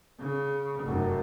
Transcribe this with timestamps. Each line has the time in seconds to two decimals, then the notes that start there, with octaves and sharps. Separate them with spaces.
0.20 C#3
0.83 F1 F#2